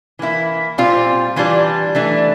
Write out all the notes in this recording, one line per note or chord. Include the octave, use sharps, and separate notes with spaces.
E3 A#3 E4
A#2 G3 C4 F4
E3 G3 D4 F4
E3 A3 D4